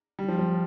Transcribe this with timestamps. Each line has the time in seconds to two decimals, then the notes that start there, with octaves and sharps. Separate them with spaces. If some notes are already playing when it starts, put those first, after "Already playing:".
0.19 G3
0.28 F3
0.39 F3